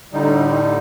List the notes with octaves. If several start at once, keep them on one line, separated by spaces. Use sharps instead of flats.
A2 D3 G3 D#4